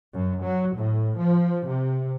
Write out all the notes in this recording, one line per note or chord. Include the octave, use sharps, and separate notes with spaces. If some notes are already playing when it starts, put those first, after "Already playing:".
F#2
F#3
A2
F3
C3